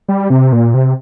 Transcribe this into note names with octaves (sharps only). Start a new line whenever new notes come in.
G3
C3
A#2
C3